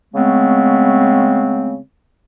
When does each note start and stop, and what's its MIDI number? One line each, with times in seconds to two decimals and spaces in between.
0.14 1.78 49
0.14 1.78 56
0.14 1.78 57
0.14 1.78 59
0.14 1.78 60